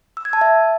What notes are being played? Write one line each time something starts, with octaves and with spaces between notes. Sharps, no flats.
E6
G#6
A5
E5